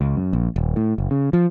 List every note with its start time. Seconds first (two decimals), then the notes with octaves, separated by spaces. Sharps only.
0.01 C#2
0.16 F#2
0.33 A#1
0.56 D#1
0.76 A2
0.98 F#1
1.11 C#3
1.33 F3